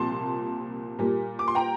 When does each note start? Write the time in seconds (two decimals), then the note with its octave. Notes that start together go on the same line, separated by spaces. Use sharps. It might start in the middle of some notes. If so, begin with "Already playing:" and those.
Already playing: C2 A#2 F3 A5 C6
0.99 A#2 G3 A#3
1.39 D6
1.48 C6
1.55 G5 A#5